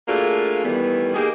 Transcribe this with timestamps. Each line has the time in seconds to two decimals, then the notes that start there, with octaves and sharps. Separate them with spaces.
0.08 A3 A#3 D4 F4 F#4 G#4
0.65 D#3 E3 G3 A3 B3
1.14 A#3 D#4 G4 G#4